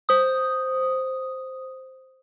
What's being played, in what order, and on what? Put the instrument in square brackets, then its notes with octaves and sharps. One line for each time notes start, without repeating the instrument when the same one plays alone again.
[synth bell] C5 D#6